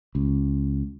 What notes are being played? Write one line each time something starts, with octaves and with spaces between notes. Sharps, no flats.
C#2